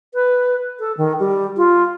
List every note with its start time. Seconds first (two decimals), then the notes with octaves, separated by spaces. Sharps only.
0.14 B4
0.80 A4
0.97 D#3
1.20 G3
1.57 F4